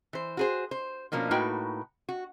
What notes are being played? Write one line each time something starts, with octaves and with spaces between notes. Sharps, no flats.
E3 C5
F#4 G#4 C5
C5
B2 F3 A#3 C#4 D4
A2 A#3 D#4 F#4 B4 G5
F#4